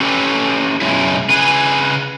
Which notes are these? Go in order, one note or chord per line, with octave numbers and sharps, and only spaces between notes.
C#4 G4 A4 B4
F#2 B2 G#3 C#4 E4
C#3 G#4 B4 G#5